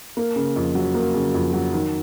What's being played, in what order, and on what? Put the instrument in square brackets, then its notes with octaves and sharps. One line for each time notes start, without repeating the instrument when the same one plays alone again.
[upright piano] A#3
C#3
F2
F#3
A#3
C#3
F2
F#3
D#3